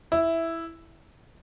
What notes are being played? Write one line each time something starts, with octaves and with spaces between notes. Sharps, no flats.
E4